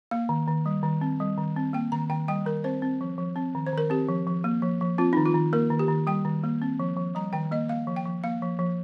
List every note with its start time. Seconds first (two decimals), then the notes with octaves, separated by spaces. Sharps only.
0.11 A#3 F5
0.29 D#3
0.48 D#3
0.66 G3
0.83 D#3
1.01 C4
1.20 G3
1.37 D#3
1.56 C4
1.73 A#3 G5
1.92 D#3 A#5
2.10 D#3 G5
2.28 G3 G5
2.45 D#3 A#4
2.64 C4 C5
2.82 C4
3.01 F3
3.18 F3
3.36 C4
3.55 D#3
3.67 C5
3.73 D#3 A#4
3.90 C4 G4
4.08 F3
4.27 F3
4.44 A#3
4.62 F3
4.81 F3
4.98 C4 F4
5.13 D#3 D#4
5.26 F4
5.34 D#3
5.53 A#3 A#4
5.70 D#3
5.79 G4
5.88 D#3
6.07 G3 G5
6.25 D#3
6.44 A#3
6.62 C4
6.80 F3
6.97 F3
7.15 G3 A#5
7.33 D#3 G5
7.51 A#3 D#5
7.69 A#3 F5
7.87 F3
7.96 G5
8.05 F3
8.24 A#3 F5
8.42 F3
8.59 F3